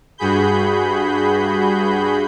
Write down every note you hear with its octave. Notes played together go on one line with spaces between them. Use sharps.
G2 F#4 G#4 B5 G6